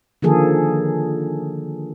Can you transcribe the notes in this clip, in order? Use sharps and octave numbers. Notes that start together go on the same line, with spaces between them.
D3 D#3 F3 A#3 G#4 A4